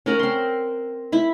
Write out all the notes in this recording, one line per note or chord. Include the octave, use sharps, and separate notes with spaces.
C#4 A#4 F#5
C4 C6
E4 B5